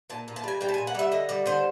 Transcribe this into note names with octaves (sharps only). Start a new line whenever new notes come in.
A#2 A5
A#2
A5
G3 G#5
G3 G5
A5
G#5
A#2
F#5
G3 E5
D3 D#5
G3 D5
D3 C5